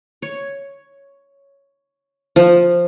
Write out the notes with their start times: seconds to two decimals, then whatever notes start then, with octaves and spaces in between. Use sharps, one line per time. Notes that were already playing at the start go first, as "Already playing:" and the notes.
0.22 C#5
2.36 F3